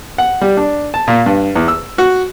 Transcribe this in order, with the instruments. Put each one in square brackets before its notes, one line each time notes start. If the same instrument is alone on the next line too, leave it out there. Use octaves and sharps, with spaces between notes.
[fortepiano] F#5
G3
D4
A5
A#2
G2
E2
E6
F#4